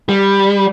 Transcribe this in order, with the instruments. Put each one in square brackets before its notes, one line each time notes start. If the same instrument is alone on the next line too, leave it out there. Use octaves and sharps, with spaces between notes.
[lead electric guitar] G3